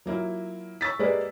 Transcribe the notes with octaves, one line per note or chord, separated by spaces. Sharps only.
F#3 A#3 E4 F4
C#6 E6 A6 B6
G#3 A#3 G4 G#4 B4 D5